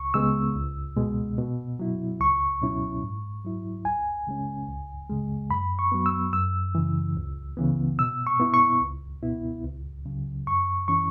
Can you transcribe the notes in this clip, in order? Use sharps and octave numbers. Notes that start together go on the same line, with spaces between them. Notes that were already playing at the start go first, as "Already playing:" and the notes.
Already playing: C#2 C#6
C#3 G#3 B3 E6
C#2
B2 G#3
B2
F#3 E4
C#2 C#6
B2 F#3 C#4 E4
G#2
F#3 E4
C#2 G#5
C#3 G#3 C#4
C#2
C#3 G#3
F#2 B5
C#6
F#3 B3
E6
F#2 E6
C#3 E3
C#2
C#3 E3 B3
B2 E6
C#6
B3 E4
C#6
C#2
B2 B3 E4
C#2
C#3 F#3
F#2 C#6
E3 C#4 E4 C#6